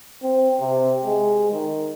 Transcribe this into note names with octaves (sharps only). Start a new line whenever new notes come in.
C4
C3
G#3
D#3